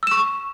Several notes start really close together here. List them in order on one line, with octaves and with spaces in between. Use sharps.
E6 E7 C#6